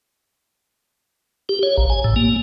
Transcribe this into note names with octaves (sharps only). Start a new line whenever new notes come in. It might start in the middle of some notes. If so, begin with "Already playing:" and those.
G4
C#5
A#1
G#5
A2
A#3